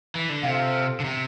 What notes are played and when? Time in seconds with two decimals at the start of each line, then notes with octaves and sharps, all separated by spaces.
0.15 E3
0.29 D3
0.43 C3 F4 A4 C5 F5
1.00 D3
1.04 C3